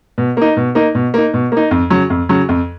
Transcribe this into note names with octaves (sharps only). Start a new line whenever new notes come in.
B2
A#3 D#4
B2
A#3 D#4
B2
A#3 D#4
B2
A#3 D#4
F2
C#3 F#3
F2
C#3 F#3
F2